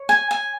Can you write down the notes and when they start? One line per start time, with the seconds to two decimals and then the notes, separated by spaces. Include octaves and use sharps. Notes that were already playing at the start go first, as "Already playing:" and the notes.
Already playing: C#5
0.09 G#5
0.31 G#5